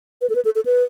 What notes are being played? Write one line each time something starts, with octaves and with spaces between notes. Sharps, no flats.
B4
A4
B4
A4
A4
B4